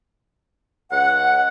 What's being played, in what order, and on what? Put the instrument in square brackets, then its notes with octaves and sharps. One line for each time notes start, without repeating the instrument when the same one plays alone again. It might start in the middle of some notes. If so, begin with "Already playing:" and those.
[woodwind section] C#2 F#5